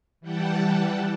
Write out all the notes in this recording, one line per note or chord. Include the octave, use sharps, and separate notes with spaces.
E3 G3 F#5 G5 A5